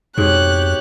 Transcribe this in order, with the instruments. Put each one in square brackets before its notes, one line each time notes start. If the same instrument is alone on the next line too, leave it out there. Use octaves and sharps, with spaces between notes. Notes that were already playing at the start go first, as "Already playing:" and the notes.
[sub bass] F2 [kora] G#2 B2 [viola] G4 C#5 [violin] F#6